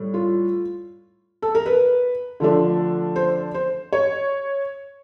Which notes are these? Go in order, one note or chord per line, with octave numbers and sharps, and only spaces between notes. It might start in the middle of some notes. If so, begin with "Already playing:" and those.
Already playing: A2 G3
F4
A4
A#4
B4
D3 F3 A3 D4
C5
C5
C#5